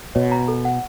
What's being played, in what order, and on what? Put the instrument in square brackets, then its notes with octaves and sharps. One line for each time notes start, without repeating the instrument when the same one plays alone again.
[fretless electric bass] B2 [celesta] C#5
[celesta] A#5
A4
F#5